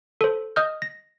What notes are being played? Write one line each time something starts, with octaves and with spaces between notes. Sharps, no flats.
A4 C5
D#5 D#6 F6 G6
A#6